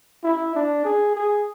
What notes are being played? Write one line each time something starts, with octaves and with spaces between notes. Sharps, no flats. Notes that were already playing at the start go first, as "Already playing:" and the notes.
E4
D4
G#4
G#4